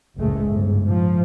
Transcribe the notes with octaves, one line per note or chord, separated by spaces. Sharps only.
F#1 C#2 A2 G#3 A3
G1 G#2
A2 F3